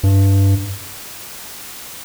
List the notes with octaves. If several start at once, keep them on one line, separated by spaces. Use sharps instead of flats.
G2